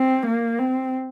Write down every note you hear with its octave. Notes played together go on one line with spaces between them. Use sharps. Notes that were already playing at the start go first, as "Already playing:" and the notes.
Already playing: C4
A#3
C4